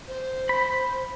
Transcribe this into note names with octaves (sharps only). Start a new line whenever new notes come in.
C5
B5